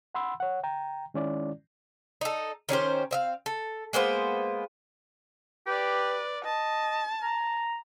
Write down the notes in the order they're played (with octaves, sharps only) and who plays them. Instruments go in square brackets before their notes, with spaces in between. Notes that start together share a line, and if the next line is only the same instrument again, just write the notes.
[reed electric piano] F#5 B5 C6 E6
C#5 F#5
G5 A#5
D#3 G#3 C#4 E4 D5
[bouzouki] D#4 A4
D#3 C#4 G4 C5
C4 E5 F5
A4
G#3 A#3 B3 C5
[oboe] G4 [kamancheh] B4 D5
[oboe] D#5 [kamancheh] A5
[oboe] A#5